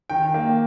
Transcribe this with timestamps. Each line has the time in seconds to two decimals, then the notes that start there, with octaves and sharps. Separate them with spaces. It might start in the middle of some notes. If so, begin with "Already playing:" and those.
0.10 D#3 G5
0.34 A#3